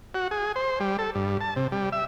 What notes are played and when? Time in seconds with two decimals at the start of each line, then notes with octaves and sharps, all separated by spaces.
0.14 F#4
0.31 G#4
0.56 C5
0.80 G3
0.99 A4
1.15 G2
1.41 A5
1.56 C3
1.72 G3
1.92 E5